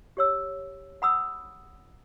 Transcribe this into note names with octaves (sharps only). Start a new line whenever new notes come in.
G4 C#5 E6
F#5 B5 D#6 E6